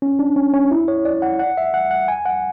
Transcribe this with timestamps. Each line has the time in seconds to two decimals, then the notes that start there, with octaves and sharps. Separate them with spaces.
0.02 C#4
0.19 D4
0.36 C#4
0.53 C#4
0.71 E4
0.88 C#5
1.05 D5
1.22 F#5
1.39 F#5
1.57 E5
1.74 F#5
1.91 F#5
2.08 G#5
2.26 F#5